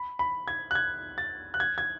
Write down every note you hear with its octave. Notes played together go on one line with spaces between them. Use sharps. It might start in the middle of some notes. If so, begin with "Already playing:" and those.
Already playing: B5
B5
G#6
F#6
G#6
A6
F#6
G#6
G#6